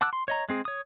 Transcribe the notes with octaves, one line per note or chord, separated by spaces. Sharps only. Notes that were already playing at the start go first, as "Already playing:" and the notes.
F#5 A5 D6 E6 F#6
C6
C#5 D#5 A#5
G#3 C4 G#4
C#5 D#6